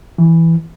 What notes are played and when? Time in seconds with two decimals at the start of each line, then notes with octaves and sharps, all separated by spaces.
0.18 E3